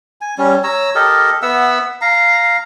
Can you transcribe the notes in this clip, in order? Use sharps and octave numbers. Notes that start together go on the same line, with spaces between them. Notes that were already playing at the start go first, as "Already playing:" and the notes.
G#5
G3 C#4
C#5 A#5 E6
G4 A4 A#4 D#5
B3 E5 F#5 E6
F5 A#5